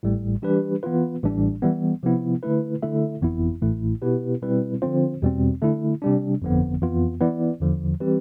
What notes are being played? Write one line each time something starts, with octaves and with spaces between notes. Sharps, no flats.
A1 A2 G3
E3 G3 D4 G4 B4
E3 B3 F4 B4
A1 A2 E3 G3 D4
E3 G3 B3
C3 F3 B3 E4
D3 A3 E4 B4
D3 A3 E4 A4 E5
G1 F2 E3 B3 E4
A1 A2 E3 A3 E4
B2 B3 E4 G4 B4
B2 G3 C4 E4 B4
D3 F3 C4 F4 C5
E2 B2 G3 C4
D3 A3 E4
C3 G3 D4
G1 F2 D3 F3 B3
F2 E3 B3 F4
E3 B3 E4 B4 D5
E2 D3 F3
E3 G3 C4 G4 B4